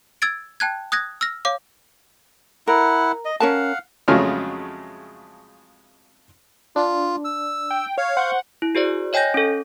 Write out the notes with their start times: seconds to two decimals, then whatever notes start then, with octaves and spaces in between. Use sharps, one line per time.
0.22 E6 G#6 A6 D7
0.60 G5 A5 F#6 G#6
0.92 D#6 F#6 G#6 A#6
1.21 E6 F6 A#6
1.45 C#5 F5 D6
2.67 E4 A#4 F#5
3.25 D#5
3.40 C#4 A#4 F5 F#5 A5
4.08 F2 C#3 F#3 G#3 A3 F6
6.76 D4 F4
7.25 E6
7.70 G5
7.98 C#5 F5
8.17 C5 F#5 C#6 G6
8.62 E4
8.75 F#4 G#4 C5 D5
9.13 C#5 D#5 G5 G#5 G6 A#6
9.34 C#4 A4